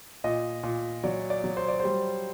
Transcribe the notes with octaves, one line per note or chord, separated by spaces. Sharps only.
A#2 D#5
A#2
F#3 D5
D5
F#3
C5
D5
G3 C5